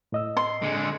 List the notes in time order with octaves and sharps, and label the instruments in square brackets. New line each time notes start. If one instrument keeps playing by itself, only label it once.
[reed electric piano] A2 D#5 E6
[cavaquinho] C6
[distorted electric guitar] D3 G#3